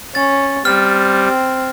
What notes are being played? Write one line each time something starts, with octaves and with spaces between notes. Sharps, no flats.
C#4 A6
G3 C4 F6